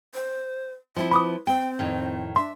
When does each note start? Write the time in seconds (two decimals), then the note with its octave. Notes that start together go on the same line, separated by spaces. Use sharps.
0.14 C5
0.96 F3 C4 E4 E5
1.11 B4 B5 D6 D#6
1.47 C4 G5
1.79 F2 A2 D#3
2.36 D4 E5 C6